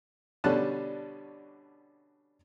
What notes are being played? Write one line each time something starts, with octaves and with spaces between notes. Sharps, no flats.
B2 D3 G3 C#4 A5 F#6